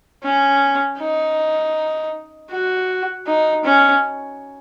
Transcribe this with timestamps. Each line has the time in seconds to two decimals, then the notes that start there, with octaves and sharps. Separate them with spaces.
0.25 C#4
0.99 D#4
2.51 F#4
3.27 D#4
3.65 C#4